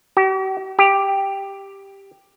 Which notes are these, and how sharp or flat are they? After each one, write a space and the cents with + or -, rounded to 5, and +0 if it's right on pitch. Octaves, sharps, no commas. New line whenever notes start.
G4 -45
G4 +5